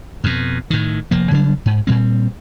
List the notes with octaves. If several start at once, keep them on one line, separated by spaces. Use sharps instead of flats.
F2 B2
A2 D#3
F1 F3 A#3
C#3 F#3 G3 D4
G#2
A#2 G3 C4